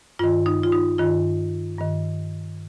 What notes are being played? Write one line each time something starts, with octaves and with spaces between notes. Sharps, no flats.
G2 D#3 F4
D#4
F4
D#4
G2 D#3 F4
G2 D#3